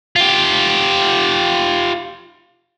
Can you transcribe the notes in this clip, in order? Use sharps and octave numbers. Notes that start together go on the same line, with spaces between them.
F4 G4